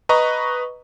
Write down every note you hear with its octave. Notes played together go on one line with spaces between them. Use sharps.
B4 D#5 A#5 C#6